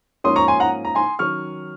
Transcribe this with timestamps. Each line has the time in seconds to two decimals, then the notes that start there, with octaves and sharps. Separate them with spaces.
0.24 G#2 F3 A#3 C#4 C6 D#6
0.36 A#5 C#6
0.48 G#5 C6
0.60 F#5 A#5
0.85 A#5
0.95 G#5 C6
1.19 D#3 F#3 C#4 C#6 F6